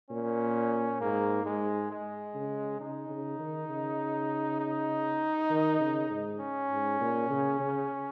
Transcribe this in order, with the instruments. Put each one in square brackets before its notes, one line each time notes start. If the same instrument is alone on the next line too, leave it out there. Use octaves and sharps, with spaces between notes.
[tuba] A#2 [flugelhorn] C#4
[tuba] G#2 [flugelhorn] A#3
[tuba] G#2 [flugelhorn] G#3
[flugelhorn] G#3
[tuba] C#3
[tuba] C#3 [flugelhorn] D#4
[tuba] C#3
D#3
C#3
[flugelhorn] D#4
[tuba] D#3
C#3
G#2
[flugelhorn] C#4
[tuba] G#2
A#2
C#3
C#3